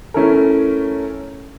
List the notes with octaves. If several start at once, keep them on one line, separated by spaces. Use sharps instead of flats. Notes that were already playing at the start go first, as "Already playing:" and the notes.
A3 C#4 E4 A#4